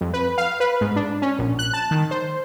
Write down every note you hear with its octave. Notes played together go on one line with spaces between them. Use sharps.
F2
B4
F5
B4
G#2
D4
C#4
A#1
F#6
A5
D#3
C5